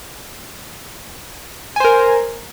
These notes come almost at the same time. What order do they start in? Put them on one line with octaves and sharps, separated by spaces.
G#5 C5 A#4